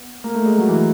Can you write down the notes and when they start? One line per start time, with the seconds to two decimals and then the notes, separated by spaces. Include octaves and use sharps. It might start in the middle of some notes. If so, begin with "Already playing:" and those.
Already playing: B3
0.24 A#3
0.35 A3
0.46 G#3
0.58 F#3
0.68 E3